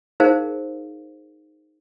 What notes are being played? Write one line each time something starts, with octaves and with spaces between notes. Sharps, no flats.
D#4 G#4 A#4 C5 F5